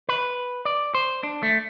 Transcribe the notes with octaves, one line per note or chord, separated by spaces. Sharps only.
B4
D5
C5
D4
A3